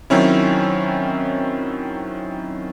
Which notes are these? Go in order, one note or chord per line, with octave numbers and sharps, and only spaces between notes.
D#3 F#3 C4 C#4 E4